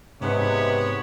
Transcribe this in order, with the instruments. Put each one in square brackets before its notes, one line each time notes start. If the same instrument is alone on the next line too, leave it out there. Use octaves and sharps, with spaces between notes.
[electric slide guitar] G#2 D#4 B4 [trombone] C3 [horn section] G#3 B3 C#5